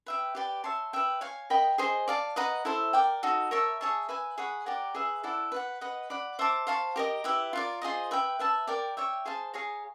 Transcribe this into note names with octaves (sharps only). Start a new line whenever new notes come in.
B4 E5 G5
G4 B4 D5 G5
C#5 E5 A5 C6
B4 E5 G5
C#5 F5 G#5
A#4 D#5 G5 B5
G#4 C5 D#5
D5 F5 A5
B4 D#5 F#5 A#5
E4 A4 C5 E5
A#4 D5 G5
D#4 F#4 A4
A#4 C#5 E5 A5
G#4 C#5 E5 A5
B4 E5 G#5
G#4 C#5 F#5 B5
G4 A#4 D5 F#5
G#4 B4 E5
E4 A4 D5 F#5
B4 D5 F#5
B4 D#5 F#5
D5 F#5 B5
C5 E5 A5 D6
C5 F5 A5 C#6
G4 A#4 D#5
E4 G4 B4 E5
F4 A#4 D5
F4 G#4 C5 D#5
B4 E5 G5
B4 E5 A5
A#4 D5 G5
C#5 E5 G5
G#4 C5 F5 A5
G#4 C#5 F5 A#5